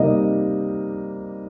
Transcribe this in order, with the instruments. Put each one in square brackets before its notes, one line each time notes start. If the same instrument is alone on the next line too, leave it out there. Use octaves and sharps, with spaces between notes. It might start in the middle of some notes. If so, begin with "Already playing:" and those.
Already playing: [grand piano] C3 G3 A#3 D#4 D#5